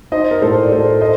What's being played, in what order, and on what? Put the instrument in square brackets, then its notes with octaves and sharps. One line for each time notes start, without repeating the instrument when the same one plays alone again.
[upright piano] D#4 C5 D#5
A#4
A2 A4 C5
D5
A2 A4 C5
C5 D#5